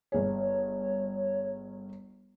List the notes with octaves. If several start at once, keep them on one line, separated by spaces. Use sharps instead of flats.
G1 G#4 C#5